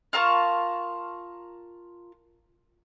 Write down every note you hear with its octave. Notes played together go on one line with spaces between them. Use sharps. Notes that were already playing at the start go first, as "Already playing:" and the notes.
F4 A#4 A5 C#6